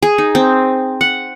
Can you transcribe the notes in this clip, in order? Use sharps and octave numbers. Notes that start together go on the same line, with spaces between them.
G#4
D#4
C4
F#5